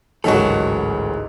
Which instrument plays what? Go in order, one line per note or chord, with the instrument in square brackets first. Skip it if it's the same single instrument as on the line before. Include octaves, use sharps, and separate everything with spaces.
[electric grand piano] A1 D2 G#2 [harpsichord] D#3 F#3 G#3 [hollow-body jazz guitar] F#4 A4